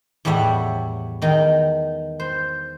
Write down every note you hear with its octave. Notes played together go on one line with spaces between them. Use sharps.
E2 A2 G3 C#5 E5 F#5
E2 D#3 D#4
C5